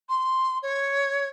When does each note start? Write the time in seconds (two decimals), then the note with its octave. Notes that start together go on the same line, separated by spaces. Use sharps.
0.09 C6
0.62 C#5